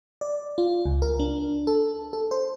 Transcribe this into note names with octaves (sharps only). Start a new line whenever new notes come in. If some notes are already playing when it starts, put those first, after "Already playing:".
D5
F4
C#2
A#4
D4
A4
A4
C5